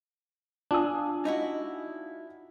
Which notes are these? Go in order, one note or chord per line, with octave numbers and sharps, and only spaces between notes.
D4 F4 G#5 D#6
D#4 E4 F#4